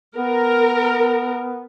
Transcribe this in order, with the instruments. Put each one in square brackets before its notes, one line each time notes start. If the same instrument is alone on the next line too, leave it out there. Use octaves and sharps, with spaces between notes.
[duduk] B3 [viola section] A#4